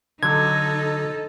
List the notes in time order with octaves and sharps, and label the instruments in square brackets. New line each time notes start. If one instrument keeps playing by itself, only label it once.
[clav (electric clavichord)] D3 F#3 [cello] D#4 A4 [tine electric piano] G#6